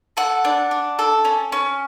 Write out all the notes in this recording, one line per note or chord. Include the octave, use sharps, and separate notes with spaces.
A4 F#5
D4
D4
A4
C#4
C#4